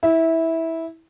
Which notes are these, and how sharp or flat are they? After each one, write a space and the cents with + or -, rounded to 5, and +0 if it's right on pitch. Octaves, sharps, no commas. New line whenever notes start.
E4 -15